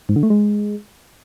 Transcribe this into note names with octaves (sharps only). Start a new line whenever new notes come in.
G#2
D3
A3
G#3